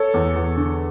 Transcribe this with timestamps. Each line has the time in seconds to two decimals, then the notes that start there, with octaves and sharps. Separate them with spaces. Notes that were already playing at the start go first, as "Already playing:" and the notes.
Already playing: A4 C#5
0.14 E2
0.36 E2
0.57 D3